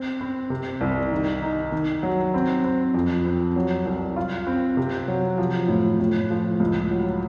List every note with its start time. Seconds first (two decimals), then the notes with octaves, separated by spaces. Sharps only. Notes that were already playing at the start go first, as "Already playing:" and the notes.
Already playing: C4
0.21 C4
0.50 C3
0.81 C2
1.12 D#3
1.42 D#4
1.72 D#3
2.03 F#3
2.34 C4
2.64 C4
2.94 F2
3.25 C4
3.56 F#3
3.85 C2
4.16 F4
4.47 C4
4.77 C3
5.08 F#3
5.38 F3
5.68 A2
6.00 A2
6.30 F3
6.60 C#2
6.91 F#3